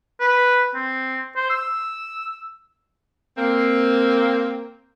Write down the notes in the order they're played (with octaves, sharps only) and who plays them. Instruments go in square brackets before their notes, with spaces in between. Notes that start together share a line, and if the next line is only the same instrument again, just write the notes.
[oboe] B4
C4
C5
E6
[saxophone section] A#3 C4